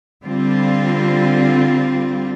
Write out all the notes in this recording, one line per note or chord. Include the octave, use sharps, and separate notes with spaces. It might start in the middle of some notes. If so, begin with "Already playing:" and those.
D3 G3 C4 F4